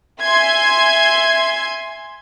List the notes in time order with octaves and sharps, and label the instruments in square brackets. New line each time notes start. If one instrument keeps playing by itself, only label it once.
[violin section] E5 G#5 C6 G#6